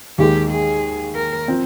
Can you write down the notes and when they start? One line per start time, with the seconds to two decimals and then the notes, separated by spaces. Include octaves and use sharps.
0.18 D#2 D#3 G#3 G4
0.51 G#4
1.15 A#4
1.48 F3 C4